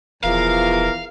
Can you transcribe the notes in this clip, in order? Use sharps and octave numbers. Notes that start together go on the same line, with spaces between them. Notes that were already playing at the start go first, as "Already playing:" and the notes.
E1 E2 E3 F3 A#4 F5